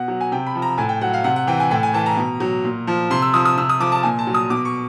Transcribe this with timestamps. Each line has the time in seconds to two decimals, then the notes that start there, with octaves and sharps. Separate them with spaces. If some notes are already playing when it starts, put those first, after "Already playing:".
Already playing: B2 F#5
0.08 F#3
0.21 G#5
0.32 C3 G5
0.47 B5
0.55 F3
0.62 A#5
0.78 A2 G#5
0.89 G5
1.01 F#3 F#5
1.13 F5
1.24 C3 F#5
1.36 F#5
1.47 E3 G5
1.60 G#5
1.71 A2 G5
1.83 G#5
1.94 E3 A5
2.06 A#5
2.17 B2
2.40 F#3
2.64 A#2
2.87 F3
3.10 C3 C6
3.22 E6
3.33 F3 D#6
3.45 D#6
3.58 C3 E6
3.69 D#6
3.80 F3 D6
3.92 A5
4.03 A#2 G#5
4.19 A5
4.27 F#3
4.34 D#6
4.50 B2 D6
4.65 C#6